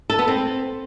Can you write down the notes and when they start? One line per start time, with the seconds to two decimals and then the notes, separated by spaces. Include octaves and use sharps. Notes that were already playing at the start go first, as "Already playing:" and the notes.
0.10 A4
0.19 B3
0.28 C4